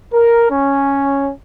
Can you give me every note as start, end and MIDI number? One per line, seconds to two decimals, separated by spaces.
0.13 0.51 70
0.51 1.31 61